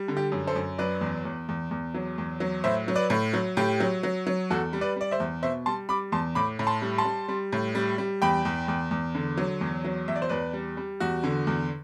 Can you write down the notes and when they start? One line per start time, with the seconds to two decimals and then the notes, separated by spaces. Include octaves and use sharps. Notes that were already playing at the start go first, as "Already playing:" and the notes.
Already playing: G3
0.08 D3
0.17 G4
0.32 F#2
0.47 A4 C5
0.56 F#2
0.78 F#3 B4 D5
1.01 E2
1.25 E2
1.49 E2
1.71 E2
1.94 F#3
2.18 E2
2.40 F#3
2.64 A2 C5 E5
2.88 F#3
2.95 B4 D5
3.10 A2
3.33 F#3
3.57 A2 G4
3.80 F#3
4.03 F#3
4.27 F#3
4.50 E2 F#4 A4
4.73 G3
4.81 B4 D5
4.96 G3 D5
5.11 C5 E5
5.20 E2
5.43 B2 C5 E5
5.66 G3 A5 C6
5.89 G3 B5 D6
6.12 E2 A5 C6
6.35 A2 B5 D6
6.59 A2
6.67 A5 C6
6.82 G3
6.98 A5 C6
7.05 G3
7.29 G3
7.53 A2
7.75 G3
7.98 G3
8.22 E2 G5 B5
8.45 E2
8.68 E2
8.91 E2
9.15 D3
9.37 F#3
9.61 E2
9.85 F#3
10.08 E2 E5
10.16 D5
10.22 C5
10.29 E2 B4 D5
10.53 G3
10.77 G3
11.00 E2 F#4
11.23 D3
11.47 E2